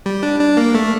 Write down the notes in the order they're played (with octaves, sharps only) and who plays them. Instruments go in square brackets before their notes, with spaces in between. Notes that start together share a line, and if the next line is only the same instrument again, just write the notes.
[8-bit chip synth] G3
D4
D4
A#3
A3